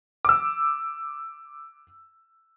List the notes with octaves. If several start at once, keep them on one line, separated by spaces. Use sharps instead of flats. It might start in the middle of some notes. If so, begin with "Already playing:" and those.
D6 E6